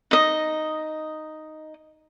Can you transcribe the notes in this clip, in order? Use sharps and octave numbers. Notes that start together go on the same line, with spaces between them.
D#4 D#5